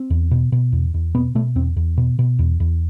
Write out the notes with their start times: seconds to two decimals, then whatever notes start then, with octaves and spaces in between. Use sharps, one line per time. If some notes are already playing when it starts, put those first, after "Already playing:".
Already playing: C4
0.10 E2
0.31 B2
0.52 B2
0.72 E2
0.94 E2
1.15 B2 B3
1.35 B2 A3
1.55 E2 C4
1.76 E2
1.97 B2
2.19 B2
2.39 E2
2.60 E2